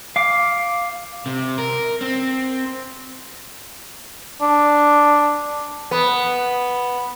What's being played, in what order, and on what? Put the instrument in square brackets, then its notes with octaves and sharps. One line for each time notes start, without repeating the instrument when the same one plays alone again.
[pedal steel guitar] F5 D6
[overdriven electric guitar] C3
A#4
C4
[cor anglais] D4
[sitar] B3